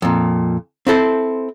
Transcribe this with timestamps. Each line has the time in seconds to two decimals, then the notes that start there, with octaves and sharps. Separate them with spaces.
0.02 F2 A#2
0.87 C4 E4 A4 C5